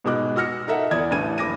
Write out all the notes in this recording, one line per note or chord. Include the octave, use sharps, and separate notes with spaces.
G#2 B2 G#3 D6 F#6
F#4 E6 F6 A#6 C#7
D#4 A4 A#4 E5 F#5
E2 D5 D#6 G#6
A1 D4 G#6 D#7
F#1 D6 A#6 D#7